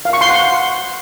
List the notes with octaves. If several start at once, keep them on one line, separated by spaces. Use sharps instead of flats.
F5
C#6
C6
F#5